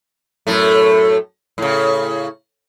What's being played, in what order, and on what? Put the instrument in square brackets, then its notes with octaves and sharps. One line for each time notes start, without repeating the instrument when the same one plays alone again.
[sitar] F#2 A2 A3
A2 C#3